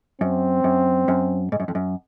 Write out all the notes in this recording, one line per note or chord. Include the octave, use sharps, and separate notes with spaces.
F#2 C4
F#2
F#2
G#2
F#2
F2
F#2